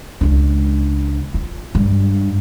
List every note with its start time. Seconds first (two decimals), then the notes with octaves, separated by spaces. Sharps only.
0.21 C#2 D4
1.34 F4
1.75 G2